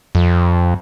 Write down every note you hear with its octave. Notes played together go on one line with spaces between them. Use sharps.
F2